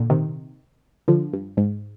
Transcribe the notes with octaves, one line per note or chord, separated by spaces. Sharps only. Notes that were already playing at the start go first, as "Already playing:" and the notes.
Already playing: A#2 D3
C3 D#3
D3 F3
G2
G#2